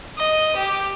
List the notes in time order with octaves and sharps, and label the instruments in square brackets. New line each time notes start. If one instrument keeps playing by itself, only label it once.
[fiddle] D#5
G4